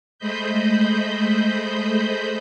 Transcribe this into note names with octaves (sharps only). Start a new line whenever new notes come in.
G#3 A3 C5 D#5 B5 G6